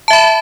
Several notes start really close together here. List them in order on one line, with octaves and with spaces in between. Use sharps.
A5 E5 B5